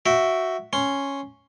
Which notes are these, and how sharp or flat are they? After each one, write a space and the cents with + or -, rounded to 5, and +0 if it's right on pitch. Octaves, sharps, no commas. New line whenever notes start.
F#4 +5 E5 +0 G5 -25
C#4 +0 C6 +0